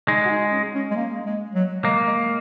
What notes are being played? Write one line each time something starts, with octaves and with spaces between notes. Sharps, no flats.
G#3 D#4
F#4
D#4
C#4
C#4
G#3
A#3
G#3
F#3
G#3 A#3
G#3